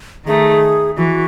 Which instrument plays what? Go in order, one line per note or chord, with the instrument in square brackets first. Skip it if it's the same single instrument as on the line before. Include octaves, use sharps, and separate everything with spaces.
[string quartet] D#3 A3 D#4 [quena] G#4
[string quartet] E3 [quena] F#4